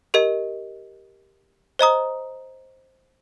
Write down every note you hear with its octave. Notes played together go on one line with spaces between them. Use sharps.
G4 A#4 D#5
C5 D#5 A#5 D#6